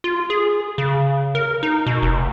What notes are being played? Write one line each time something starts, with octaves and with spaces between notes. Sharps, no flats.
F4
G#4
C#3
A#4
D#4
B2
F1